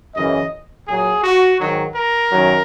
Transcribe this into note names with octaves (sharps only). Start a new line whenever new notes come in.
F#2 C#3 E3 D#5
A#2 F#3 G#4
F#4
G#2 D#3 F#3
A#4
F#2 D#3 F#3